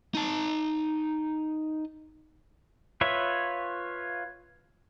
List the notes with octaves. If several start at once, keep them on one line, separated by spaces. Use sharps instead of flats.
D#4 A5
F4 B4 C#5 E5